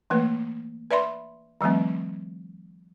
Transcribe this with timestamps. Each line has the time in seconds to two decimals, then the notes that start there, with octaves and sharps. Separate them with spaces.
0.10 E3 A3 A#3 B4
0.91 B4 D5 E5 B5 C6
1.61 D#3 F3 G3 A3 C4